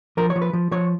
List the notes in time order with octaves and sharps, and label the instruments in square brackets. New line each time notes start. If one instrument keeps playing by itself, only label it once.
[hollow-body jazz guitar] F3 A#4
C#5
F3
B4
F3
F3 C#5